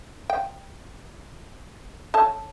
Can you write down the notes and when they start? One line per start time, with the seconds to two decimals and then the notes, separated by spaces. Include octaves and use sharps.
0.30 G5
2.14 A4 C#5 A5